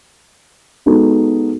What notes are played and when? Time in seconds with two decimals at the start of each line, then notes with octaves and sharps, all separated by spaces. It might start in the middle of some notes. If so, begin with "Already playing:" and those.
0.86 G#3 B3 D#4 F#4 A4